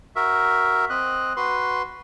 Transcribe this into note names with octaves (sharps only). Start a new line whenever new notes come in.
F#4 A#4 E5
C4 D#5 F#6
F#4 B4 C6